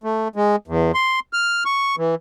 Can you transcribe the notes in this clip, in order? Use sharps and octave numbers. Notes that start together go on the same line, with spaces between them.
A3
G#3
E2
C6
F6
C#6
E3